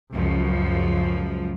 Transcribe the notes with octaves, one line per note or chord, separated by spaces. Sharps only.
C#2 F#2 F3